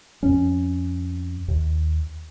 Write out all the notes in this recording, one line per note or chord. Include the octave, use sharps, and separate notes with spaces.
F2 C#4
D#2